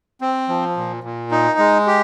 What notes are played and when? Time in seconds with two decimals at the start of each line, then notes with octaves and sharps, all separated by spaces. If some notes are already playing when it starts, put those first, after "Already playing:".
0.21 C4
0.49 F3
0.77 A#2
1.04 A#2
1.31 D#4
1.59 G#3
1.87 G4